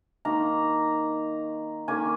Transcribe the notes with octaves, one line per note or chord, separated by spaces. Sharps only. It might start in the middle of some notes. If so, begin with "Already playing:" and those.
D#3 A#3 D#4 A#5
D#3 A#3 C#4 G#5